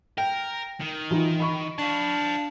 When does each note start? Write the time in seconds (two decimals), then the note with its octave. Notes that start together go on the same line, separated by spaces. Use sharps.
0.18 A#4 G5
0.81 D#3
1.11 E3 D#4 F4
1.40 B5 C#6
1.79 D4 F5 A5